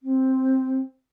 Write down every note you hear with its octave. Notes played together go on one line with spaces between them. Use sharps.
C4